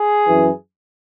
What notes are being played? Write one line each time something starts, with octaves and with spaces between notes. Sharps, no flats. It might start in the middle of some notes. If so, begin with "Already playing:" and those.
Already playing: G#4
F#2 E3